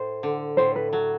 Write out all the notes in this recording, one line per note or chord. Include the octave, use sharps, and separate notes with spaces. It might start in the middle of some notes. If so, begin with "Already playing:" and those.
Already playing: A2 C5
D3
A2 C5
B4
F#3 A4